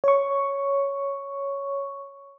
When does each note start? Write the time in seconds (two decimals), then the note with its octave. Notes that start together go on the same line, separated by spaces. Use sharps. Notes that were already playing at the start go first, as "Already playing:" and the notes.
0.04 C#5 C#6